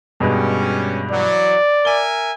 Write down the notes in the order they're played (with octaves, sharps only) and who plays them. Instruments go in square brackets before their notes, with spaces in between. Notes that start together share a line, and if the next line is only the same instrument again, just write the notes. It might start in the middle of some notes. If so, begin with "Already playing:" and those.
[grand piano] G2 B2 G#3 [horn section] G3 C#4
[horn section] E3 F#3 [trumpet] D5
[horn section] A#4 E5 G#5 [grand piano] G7